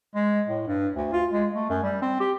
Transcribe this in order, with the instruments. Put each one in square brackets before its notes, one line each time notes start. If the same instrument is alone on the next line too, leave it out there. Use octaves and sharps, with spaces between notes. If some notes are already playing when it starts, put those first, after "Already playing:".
[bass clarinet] G#3
A2
G2
D2
F4
G#3
A3
F#2
G3
C4
G4